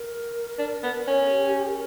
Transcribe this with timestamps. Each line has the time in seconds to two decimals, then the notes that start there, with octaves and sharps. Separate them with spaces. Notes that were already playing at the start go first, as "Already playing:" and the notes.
Already playing: A#4
0.59 D4
0.83 B3
1.08 C#4
1.32 G4
1.68 A#4